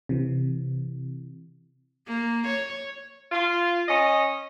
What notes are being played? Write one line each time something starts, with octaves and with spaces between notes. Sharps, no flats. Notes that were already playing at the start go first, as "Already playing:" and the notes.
C3 E3
A#3
C#5
F4
C#4 D#5